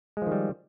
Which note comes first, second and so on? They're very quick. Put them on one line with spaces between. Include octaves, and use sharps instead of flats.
G#3 F3 D#3 G3